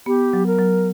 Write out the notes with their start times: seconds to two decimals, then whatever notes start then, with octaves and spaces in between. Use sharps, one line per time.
0.06 B3 G4
0.33 F#3
0.46 A#4
0.59 F#3